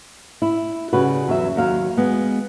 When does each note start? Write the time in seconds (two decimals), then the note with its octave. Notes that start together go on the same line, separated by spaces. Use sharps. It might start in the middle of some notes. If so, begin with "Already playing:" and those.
0.42 E4
0.93 C#3 G3 F#4 B4
1.28 E2 F#3 E5
1.56 D#2 F#3 F5
1.97 G#3 B3